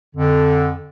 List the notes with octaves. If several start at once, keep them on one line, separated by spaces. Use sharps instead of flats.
F2 D3